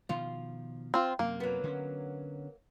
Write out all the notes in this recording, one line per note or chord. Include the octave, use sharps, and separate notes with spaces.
B2 D#3 F3 F4
C4 F4
F#2 C3 A#3
F#3 B3
D3 C4 C#4